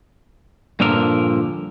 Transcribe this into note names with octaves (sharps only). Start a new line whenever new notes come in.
G2 A#2 D3 F3 A#4